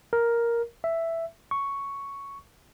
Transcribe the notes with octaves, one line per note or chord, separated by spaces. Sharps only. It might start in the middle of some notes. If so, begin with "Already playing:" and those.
A#4
E5
C#6